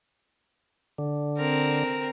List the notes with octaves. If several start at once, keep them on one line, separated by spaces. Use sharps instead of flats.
D3
C4 A#4